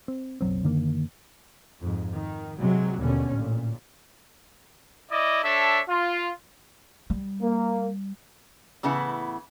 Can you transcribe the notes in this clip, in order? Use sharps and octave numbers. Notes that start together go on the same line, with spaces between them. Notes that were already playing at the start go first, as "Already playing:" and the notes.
C4
F#1 B1 F#3 C4
F#2 D3 D#3 A#3
F2 G#2
D#3
C3 F#3 G#3
D#2 B2 D3 C#4
A1 A#2
E4 D5 D#5
D4 A4 C#5 E5
F4
G3
A#3
A2 C#3 E3 B3 E4